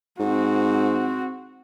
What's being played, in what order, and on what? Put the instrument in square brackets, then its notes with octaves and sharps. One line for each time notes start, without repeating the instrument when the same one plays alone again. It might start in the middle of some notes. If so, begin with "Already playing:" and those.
[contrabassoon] G#2 [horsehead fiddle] C4 F#4